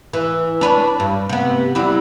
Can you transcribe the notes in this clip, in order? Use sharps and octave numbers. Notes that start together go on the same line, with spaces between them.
E3
D4 B4 C#5
G2
C3 B3
F#3 G3 E4